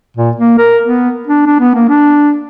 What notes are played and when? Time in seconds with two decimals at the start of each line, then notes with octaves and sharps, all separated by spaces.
0.17 A#2
0.36 A#3
0.58 A#4
0.83 B3
1.27 D4
1.46 D4
1.60 B3
1.75 A#3
1.89 D4